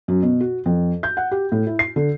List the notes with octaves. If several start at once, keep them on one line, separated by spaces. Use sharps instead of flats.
F#2
B2
F#4
F2
G6
F#5
G4
A2
E4
C7
D3